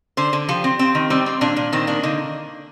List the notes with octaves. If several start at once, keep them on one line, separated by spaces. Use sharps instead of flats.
D3 C5
D3
F3 G4
C4
C4
D#3
G3 C4
C4
A#2 D4
A#2
D#3 C4
A#3 D4
D3 D#4